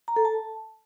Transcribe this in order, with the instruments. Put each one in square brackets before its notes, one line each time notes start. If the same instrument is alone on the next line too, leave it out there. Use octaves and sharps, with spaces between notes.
[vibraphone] A#5
A4
A5